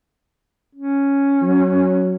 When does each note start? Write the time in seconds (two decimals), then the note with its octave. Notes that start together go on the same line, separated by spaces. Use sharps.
0.75 C#4
1.42 F#3